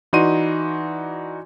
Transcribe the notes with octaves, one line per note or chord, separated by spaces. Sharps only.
E3 D#4 F#4 D5 C6 D#7